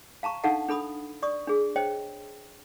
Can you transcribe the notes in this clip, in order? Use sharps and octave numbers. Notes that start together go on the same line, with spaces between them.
F5 A5 A#5 C#6
D4 D#4 A4 F5 F#5 A5
D4 A4 B5 D#6
D5 C#6 D#6
D4 G#4
C5 C#5 D#5 G5